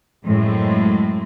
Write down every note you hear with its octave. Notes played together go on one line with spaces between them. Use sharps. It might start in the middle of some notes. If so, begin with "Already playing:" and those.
F#2 A2 G#3 C4